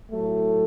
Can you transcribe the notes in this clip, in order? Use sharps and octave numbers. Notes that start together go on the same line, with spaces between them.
A2 F#3 A3